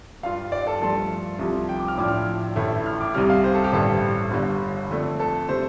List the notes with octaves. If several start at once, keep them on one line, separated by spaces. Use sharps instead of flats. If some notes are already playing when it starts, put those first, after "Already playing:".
G2 G3 F4 F5
D5
A4
G2 F3 A3 D4 F4 A4
C2 C3 F3
G5
D6
F6
A2 F3 D4 D6
F6
A1 A2 A3
F6
D6
C2 C3 G3 F6
F5
C5
A4
G4
A1 G2 D3 A4
G1 G2 D3
F2 D3 A3
A4
C3 A3 C5